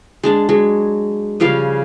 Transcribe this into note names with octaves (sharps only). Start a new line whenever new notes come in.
G#3 D4 A5
F#3 G#3
C#3 F3 G3 F5